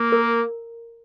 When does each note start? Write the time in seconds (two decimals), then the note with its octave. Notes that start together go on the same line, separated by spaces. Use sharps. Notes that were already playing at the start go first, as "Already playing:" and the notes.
Already playing: A#3 A#5
0.12 A#4